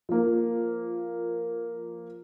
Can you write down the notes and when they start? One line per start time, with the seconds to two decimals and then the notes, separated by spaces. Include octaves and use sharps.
0.09 F3 A#3